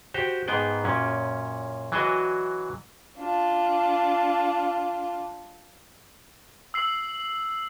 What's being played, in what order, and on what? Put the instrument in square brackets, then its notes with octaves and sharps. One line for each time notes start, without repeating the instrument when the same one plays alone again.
[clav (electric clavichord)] F#4 G4 C5 G5
G#2 B3 G#4 G5
F#2 A#2 C#4
E3 F#3 D4 F#4 D#5 G#5
[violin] D4 F4
[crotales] E6 C7 F#7